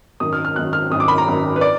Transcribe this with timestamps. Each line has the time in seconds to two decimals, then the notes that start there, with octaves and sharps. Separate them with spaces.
0.20 G#1 F#2 D#3 D#6
0.33 F6
0.45 F6
0.56 G#1 F#2 D#3 F#6
0.73 F6
0.90 G#1 F#2 D#3 D#6
1.00 D6
1.08 B5
1.18 A#5
1.26 G#1 F#2 D#3
1.56 B4
1.61 D5